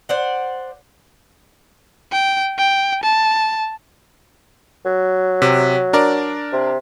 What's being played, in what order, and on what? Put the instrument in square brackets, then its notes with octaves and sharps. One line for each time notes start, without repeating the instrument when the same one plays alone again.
[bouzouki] C5 D5 F#5
[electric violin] G5
G5
A5
[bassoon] F#3
[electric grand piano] C3
D4 A#4 D5
[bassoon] C3